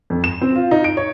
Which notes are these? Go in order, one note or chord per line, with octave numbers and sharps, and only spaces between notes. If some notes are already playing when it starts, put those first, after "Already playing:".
F2
E7
C4
F4
D#4
D7
C#5